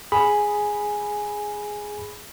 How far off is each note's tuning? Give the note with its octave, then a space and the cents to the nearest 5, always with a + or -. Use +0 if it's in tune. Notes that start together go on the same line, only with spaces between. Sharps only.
G#4 +0 G#5 +0 B5 +0